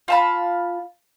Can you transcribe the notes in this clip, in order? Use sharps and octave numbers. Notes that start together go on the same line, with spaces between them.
F4 A5 B5